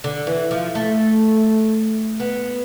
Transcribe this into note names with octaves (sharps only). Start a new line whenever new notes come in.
D3
E3
F3
A3
B3